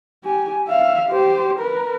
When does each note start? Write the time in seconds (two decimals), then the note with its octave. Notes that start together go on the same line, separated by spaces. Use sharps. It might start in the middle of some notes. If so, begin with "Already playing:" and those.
0.24 G4 G#5
0.67 E5 F5
1.09 G4 C5
1.60 A#4 B4